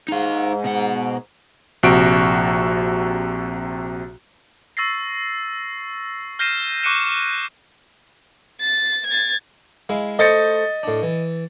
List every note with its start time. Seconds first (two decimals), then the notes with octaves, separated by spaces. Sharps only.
0.08 G#2 D#4 F5
0.64 B2 F#5
1.83 A#1 C3 F#4 D7
4.77 C#6 E6 A6 A#6 C7
6.39 F6 G6 A#6 C7 D#7 E7
6.83 C#6 D6 F#6 C#7 D#7 E7
8.61 A6
9.07 G#6 A6
9.89 G#3 E4 F5
10.19 A3 C5 D#5 A6 C#7
10.83 A2 D4
11.03 E3